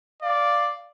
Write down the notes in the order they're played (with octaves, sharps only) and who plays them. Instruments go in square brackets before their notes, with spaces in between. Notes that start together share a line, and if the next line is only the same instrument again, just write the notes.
[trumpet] D5 [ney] F5